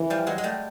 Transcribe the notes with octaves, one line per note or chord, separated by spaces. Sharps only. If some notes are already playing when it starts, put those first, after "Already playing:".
Already playing: E3
F3 G3
F#3 G#3
G#3
G3 A3